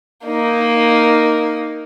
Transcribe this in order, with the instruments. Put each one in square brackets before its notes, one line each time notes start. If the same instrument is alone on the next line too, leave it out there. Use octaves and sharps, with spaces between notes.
[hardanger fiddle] A#3 D#4